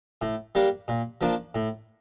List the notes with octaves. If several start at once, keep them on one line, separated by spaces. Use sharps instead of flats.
A2
G3 A#3 D4
A#2
F3 A#3 D4
A2